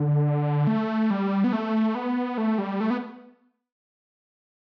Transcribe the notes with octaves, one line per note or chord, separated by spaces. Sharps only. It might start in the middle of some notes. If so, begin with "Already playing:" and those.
Already playing: D3
A3
G3
B3
A3
B3
A3
G3
A3
B3